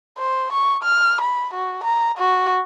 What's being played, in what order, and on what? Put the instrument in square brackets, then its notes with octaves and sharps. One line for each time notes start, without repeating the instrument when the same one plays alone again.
[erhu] C5
C#6
F6
B5
F#4
A#5
F#4